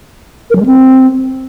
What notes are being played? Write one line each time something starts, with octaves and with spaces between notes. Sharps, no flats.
A#4
F#3
G#3
C4